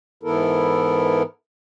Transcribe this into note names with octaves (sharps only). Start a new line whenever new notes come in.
G#2 E3 B3 E4 A4 A#4